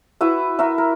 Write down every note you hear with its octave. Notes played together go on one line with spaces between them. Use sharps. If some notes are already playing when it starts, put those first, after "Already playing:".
E4 F#4 B4 E5
F#4 A#4 E5
A#4